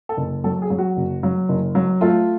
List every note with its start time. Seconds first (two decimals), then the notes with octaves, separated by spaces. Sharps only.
0.09 A4
0.17 F#1
0.44 F#3 A4
0.62 G#4
0.70 F#3
0.78 F#4
0.97 F#1
1.23 F#3
1.49 F#1
1.75 F#3
2.01 A3 F4